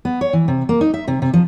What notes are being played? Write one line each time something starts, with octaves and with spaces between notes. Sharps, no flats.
B3
C#5
E3
C3
A#3
D#4
E5
C3
C3
F3